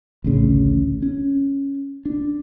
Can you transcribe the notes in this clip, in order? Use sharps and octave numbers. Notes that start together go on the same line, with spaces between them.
A1 D2 C#3
C#4
D4